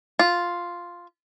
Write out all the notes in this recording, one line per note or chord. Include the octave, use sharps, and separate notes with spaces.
F4